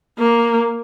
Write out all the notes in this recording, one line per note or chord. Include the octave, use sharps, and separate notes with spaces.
A#3